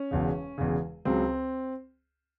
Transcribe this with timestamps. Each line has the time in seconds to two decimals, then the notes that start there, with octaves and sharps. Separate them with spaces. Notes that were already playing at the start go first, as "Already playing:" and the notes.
Already playing: C#4
0.11 E1 E2 C#3
0.58 E1 E2 C#3
1.05 C#2 C#3 F#3 C4